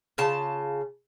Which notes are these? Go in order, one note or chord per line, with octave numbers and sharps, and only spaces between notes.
C#3 F4 A5